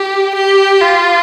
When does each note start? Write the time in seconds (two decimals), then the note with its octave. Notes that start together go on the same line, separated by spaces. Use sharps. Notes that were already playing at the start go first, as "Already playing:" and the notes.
Already playing: G4
0.35 G4
0.80 F4